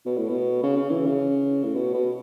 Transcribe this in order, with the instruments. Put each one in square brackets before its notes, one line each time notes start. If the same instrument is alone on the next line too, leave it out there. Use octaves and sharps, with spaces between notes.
[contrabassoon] B2
A2
B2
C#3
C#3
E3
C#3
A2
B2
B2